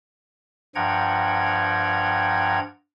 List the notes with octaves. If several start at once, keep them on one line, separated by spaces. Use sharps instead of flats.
G2 F3 F#5 G5 A#5 G#6